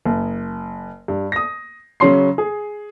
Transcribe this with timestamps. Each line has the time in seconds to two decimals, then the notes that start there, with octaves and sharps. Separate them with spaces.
0.06 F#1
1.08 G2
1.32 D#6 A#6
2.00 C#3 F#3 C#4 C6 C7
2.38 G#4